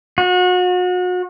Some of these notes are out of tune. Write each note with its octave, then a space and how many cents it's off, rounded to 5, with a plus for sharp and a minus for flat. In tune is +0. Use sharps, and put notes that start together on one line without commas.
F#4 -35